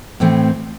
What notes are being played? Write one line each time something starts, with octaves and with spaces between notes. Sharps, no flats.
A2 E3 A3 C4